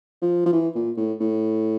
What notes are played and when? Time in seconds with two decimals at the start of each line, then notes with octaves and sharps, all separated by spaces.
0.22 F3
0.46 F3
0.53 E3
0.75 A#2
0.97 A2
1.21 A2